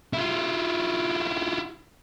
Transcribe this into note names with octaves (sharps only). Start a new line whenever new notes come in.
E4 F4